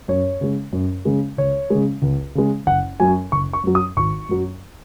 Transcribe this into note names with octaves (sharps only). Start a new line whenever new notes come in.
F#2 C#5
C#3 G#3
F#2
C#3 G#3
C#2 C#5
C#3 G#3
C#2
C#3 G#3
F#1 F#5
F#2 F#3 G#5
F#1 C#6
C#6
F#2 F#3
D#6
G#1 C#6
F#2 F#3